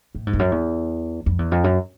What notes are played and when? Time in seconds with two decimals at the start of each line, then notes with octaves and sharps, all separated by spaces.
0.15 A2
0.27 G#2
0.33 F2
0.39 F#2
0.52 E2
1.26 F2
1.39 E2
1.52 F2
1.64 F#2